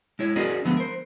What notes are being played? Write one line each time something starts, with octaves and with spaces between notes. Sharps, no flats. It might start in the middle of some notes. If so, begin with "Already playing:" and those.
G#3 E4 C#5
C#4 F#4 G#4 A#4 D5 D#5
D3 F3 G#3 A3 B3
A#4 C5